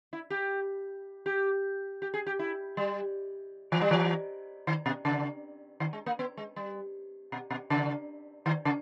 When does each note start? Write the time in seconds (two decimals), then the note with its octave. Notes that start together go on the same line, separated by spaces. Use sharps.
0.13 E4
0.30 G4
1.26 G4
2.02 G4
2.14 G#4
2.27 G4
2.39 E4
2.77 G3
3.72 E3
3.81 G3
3.91 E3
4.67 D#3
4.86 B2
5.05 C#3
5.80 D#3
5.93 G#3
6.06 A#3
6.19 B3
6.37 G#3
6.56 G3
7.32 B2
7.50 B2
7.70 C#3
8.46 D#3
8.65 C#3